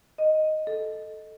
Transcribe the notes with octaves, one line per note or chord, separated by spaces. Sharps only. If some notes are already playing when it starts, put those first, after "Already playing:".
D#5
A4